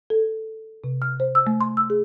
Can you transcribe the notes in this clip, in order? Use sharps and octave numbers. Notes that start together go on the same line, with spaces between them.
A4
C3
F6
C5
E6
A3
C6
E6
G#4